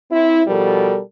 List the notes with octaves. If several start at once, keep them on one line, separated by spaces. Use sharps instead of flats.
C4 E4
B2 F3 G3 A4 A#4